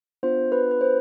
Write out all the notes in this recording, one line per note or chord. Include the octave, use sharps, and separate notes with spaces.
B3 D4 F4 C5
B4
B4
C5